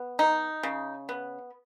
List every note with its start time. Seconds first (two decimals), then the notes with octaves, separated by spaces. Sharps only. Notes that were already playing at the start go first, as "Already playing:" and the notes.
Already playing: B3
0.19 D#4
0.63 C#3
1.09 B3